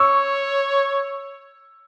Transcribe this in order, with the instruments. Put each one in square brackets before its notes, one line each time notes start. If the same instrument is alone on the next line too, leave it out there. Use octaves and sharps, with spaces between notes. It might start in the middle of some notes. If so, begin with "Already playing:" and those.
Already playing: [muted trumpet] C#5 [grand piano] C#6 E6